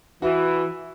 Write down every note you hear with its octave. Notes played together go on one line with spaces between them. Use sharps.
E3 F#4